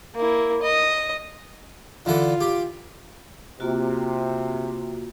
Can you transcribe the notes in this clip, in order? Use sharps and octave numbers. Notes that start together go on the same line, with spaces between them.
A#3 E4
D#5
D3 E3 F4 A4
G4
C3 A#3 F4 F#4